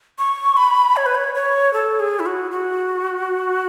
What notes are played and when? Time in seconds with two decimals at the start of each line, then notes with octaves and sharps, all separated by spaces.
0.18 C#6
0.57 B5
0.96 C#5
1.06 B4
1.15 C#5
1.35 C#5
1.73 A4
2.00 G#4
2.20 E4
2.26 F#4
2.51 F#4